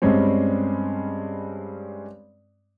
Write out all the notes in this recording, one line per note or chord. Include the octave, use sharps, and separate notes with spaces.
G2 G3 G#3 C4 C#4